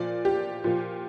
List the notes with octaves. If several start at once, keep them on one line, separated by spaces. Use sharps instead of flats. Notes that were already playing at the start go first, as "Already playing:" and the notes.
Already playing: A#2 F3 D5
G4
A#2 F3